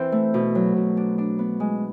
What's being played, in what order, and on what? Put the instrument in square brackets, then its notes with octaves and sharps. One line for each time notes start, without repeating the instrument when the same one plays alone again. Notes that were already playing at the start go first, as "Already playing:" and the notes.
Already playing: [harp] E3 C4
A3
B2
F#3
B2
D4
D4
B3
G#3